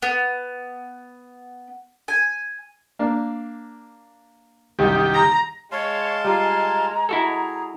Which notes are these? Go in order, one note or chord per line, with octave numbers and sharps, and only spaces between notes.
B3
G#5
A#3 D4
C2 F#2 D#3 G4 D#5
A#5
G#3 C#5 F5 A5 C6
G3 F4 A#5
E4 F#4 G#4 A4